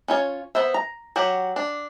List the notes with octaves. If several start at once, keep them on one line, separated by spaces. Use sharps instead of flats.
C#4 F4 C#5
B3 C5 E5
A#5
F#3 F#4 G4
D4